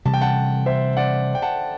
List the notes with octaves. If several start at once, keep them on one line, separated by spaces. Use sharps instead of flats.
C3 E3 G3 A5
G5
F#5 A5
C5 E5
D5 F#5
G5
F#5 A5